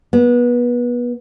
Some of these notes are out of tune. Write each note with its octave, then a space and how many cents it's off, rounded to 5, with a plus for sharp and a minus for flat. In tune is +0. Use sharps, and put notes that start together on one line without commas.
B3 -25